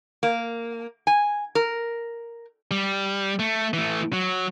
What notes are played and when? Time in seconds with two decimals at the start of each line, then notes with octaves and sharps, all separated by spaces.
0.23 A#3
1.07 G#5
1.55 A#4
2.71 G3
3.39 A3
3.73 E3 A3
4.13 F#3